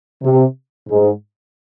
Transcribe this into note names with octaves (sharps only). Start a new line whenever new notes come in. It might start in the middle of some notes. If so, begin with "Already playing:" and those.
C3
G#2